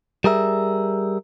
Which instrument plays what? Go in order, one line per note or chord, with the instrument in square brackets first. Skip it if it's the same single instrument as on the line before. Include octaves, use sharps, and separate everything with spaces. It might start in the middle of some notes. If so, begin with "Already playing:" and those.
[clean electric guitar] G3 G#4 A#4 E5